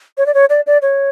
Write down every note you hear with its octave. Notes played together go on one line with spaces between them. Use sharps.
C#5
D5
C#5
D5
D5
C#5